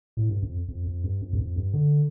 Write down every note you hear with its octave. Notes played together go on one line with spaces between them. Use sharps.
A2
G2
F2
F2
F2
G2
F2
G2
F2
G2
D3